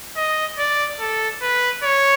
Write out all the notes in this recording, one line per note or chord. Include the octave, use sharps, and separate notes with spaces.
D#5
D5
A4
B4
C#5